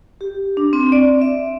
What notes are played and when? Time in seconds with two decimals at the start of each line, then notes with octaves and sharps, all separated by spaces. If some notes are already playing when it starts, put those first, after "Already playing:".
0.21 G4
0.57 D4
0.73 C4
0.92 D5
1.21 E5